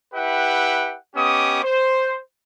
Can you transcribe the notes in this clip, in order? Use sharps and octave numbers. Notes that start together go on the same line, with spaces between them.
E4 G4 B4 E5 F#5 G5
B3 C#4 G4 D#5 D6 D#6
C5